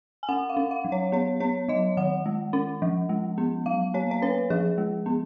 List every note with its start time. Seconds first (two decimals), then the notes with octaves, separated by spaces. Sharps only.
0.23 G#5
0.28 C#4 F#5
0.49 F5
0.57 C#4
0.71 F5
0.84 F#3
0.92 C#5
1.12 B3 C#5
1.40 B3 C#5
1.68 F#3 D#5
1.97 D#3 F#5
2.26 G#3
2.53 C#4
2.82 F3
3.09 G#3
3.38 B3
3.66 F#3 F5
3.94 A#3 C#5
4.11 C#5
4.22 C#4 B4
4.50 F3 G#4
4.78 G#3
5.06 B3